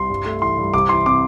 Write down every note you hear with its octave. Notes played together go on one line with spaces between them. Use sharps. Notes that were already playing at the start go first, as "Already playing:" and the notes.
Already playing: C2 C6
G2
A3
E3 C6
G2
C2 D6
E3 C6
C3 D6